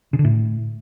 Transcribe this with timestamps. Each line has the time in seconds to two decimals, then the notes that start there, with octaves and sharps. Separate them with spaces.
0.13 C#3
0.19 D3
0.25 A2